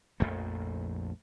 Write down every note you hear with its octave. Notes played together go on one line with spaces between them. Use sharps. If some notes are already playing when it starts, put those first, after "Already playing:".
A#1 F2 A3